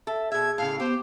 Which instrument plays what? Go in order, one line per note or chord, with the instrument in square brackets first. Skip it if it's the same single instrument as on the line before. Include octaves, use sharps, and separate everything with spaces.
[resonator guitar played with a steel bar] A4 [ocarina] E5
[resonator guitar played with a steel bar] B2 E5 [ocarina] G#4 [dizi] G#6
[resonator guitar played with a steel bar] A2 C#3 [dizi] F5
[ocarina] B3 [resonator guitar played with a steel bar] G4 [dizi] C5